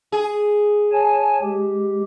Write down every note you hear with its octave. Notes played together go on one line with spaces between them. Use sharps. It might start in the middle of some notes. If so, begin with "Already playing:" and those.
G#4
C#5 G#5 A5
G#3 G4